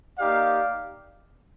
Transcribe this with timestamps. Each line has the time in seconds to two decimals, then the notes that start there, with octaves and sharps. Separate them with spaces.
0.19 A#3 D#4 G4 D5 F5